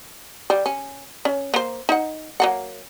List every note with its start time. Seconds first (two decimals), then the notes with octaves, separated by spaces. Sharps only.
0.50 G3
0.66 C#4
1.25 C#4
1.54 A#3 C5
1.89 D#4 F#5
2.40 F#3 A#3 F#5